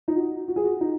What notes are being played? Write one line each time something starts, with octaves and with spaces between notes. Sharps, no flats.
D#4
F#4
F#4
G#4
F#4
D#4